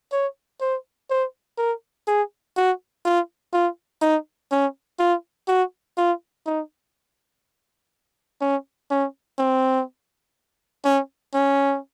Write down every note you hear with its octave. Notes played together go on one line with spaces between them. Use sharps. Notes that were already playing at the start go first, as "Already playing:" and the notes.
C#5
C5
C5
A#4
G#4
F#4
F4
F4
D#4
C#4
F4
F#4
F4
D#4
C#4
C#4
C4
C#4
C#4